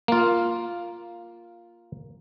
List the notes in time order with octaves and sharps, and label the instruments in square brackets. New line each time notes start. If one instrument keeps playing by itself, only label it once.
[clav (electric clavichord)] A#3 F4